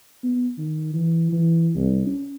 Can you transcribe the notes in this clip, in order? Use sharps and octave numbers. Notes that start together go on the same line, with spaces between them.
B3
D#3
E3
E3
C2
C#4